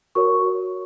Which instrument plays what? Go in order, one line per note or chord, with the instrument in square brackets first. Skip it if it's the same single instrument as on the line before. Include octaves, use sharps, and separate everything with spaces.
[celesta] F#4 A#4 C#5 C#6